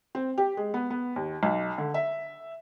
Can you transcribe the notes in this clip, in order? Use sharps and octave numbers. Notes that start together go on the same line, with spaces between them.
C4
G4
G#3
B3
B3
D#2
B1
D3
E5